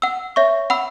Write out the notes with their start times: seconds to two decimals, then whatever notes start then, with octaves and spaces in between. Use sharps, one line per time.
0.02 F#5 E6
0.36 C#5 E5 C#6
0.70 F#5 B5 E6